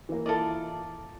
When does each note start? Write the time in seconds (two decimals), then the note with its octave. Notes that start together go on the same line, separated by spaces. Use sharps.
0.09 E3 A#3
0.26 E4 F4 A4 A#4 D5 D#5